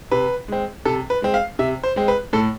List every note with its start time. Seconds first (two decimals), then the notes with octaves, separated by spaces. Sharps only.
0.11 C3 B4
0.48 G#3 C4
0.85 C3 A4
1.10 B4
1.22 G#3 C4
1.34 F5
1.59 C3 E5
1.83 C5
1.96 G#3 C4
2.08 B4
2.33 A2 A4